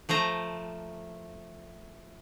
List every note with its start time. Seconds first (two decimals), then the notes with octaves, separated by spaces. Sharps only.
0.09 F3 A3 C5 A#5